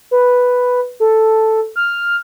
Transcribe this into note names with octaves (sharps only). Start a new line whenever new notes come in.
B4
A4
F6